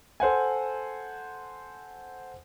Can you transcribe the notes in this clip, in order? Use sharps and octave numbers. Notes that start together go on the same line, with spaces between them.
A4 C5 F#5 G#5